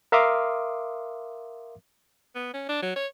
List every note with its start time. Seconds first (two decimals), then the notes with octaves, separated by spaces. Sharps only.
0.12 A#4 E5 F5 C6 D6 D#6
2.35 B3
2.54 C#4
2.69 D4
2.82 F#3
2.96 C#5